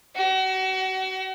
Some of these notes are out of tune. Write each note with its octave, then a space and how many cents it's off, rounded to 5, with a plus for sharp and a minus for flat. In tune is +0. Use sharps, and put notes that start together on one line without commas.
F#4 +35